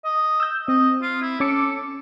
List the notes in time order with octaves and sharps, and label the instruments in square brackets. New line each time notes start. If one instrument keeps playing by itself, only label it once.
[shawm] D#5
[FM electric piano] E6 G6
[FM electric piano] C4 [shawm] D#5
[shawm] F4
E4
[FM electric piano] C#4 D6 C#7 [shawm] A4